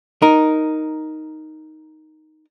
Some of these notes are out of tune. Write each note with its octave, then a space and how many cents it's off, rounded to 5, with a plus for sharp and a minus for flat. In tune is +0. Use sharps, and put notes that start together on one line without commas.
D#4 +0 A#4 +0